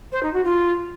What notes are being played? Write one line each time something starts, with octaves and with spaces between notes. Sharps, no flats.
C5
D#4
F#4
F4